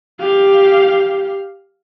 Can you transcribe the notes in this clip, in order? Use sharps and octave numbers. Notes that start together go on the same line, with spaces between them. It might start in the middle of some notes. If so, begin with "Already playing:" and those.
G4 F5